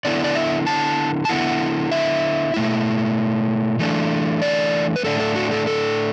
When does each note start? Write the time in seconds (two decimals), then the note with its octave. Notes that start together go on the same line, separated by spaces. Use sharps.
0.05 D3 B3 E4 D5
0.24 D5
0.36 E5
0.66 A5
1.25 A5
1.29 D3 B3 E4 F#5
1.91 E5
2.54 B2 A3 E4
3.79 E3 A3 D4
4.42 D5
4.96 B4
5.04 A2 A3 D4 A4
5.20 A4
5.36 F#4
5.51 A4
5.67 A4